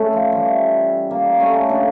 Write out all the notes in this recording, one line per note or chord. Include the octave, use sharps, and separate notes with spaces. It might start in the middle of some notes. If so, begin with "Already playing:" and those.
Already playing: A3 C#4
F3
E3 G3
G3 A#3
A3 C#4
A#3 D4